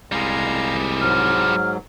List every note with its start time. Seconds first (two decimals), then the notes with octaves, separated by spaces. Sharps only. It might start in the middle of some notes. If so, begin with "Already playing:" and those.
0.12 C2 G3 G#3 F5 A#5
1.01 G#2 F#3 F6